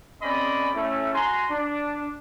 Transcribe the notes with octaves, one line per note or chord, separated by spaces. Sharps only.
C4 C#4 G#4 D5 D#5 B5
A3 C#4 E4
F#4 G#5 A#5 C6
D4